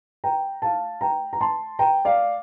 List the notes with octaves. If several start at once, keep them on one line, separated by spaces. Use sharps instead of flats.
G5 A#5
F5 A5
G5 A#5
A#5
A5 C6
G5 A#5
D5 F5